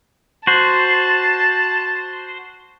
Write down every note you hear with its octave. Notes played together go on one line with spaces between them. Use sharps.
F#4 C5 A5